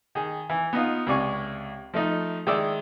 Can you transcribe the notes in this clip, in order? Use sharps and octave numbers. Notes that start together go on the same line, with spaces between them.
D#3 G#4
E3
B3 D#4 F4
C#2 C3 D5 G#5 C#6
F3 A3 D#4
D#3 G#3 E4 D5 D6 E6